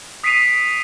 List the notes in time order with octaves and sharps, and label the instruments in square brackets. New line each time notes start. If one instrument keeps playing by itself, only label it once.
[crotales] D#6 B6 C7 D7 D#7 F7